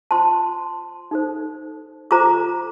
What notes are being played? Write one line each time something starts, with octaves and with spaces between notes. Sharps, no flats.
F4 C5 A5 C6
D#4 A4 C5
F4 A4 C5 A#5 D6